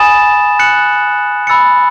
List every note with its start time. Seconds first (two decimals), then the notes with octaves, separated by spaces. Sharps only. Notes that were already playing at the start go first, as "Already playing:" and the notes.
Already playing: G#5 B5 D#6 A6 E7
0.59 F#6 C#7 F#7
1.47 B5 E6 A6 C#7